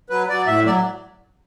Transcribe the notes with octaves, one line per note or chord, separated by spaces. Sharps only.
F#3 B4
F#3 D5
A2 E5
F#3 D5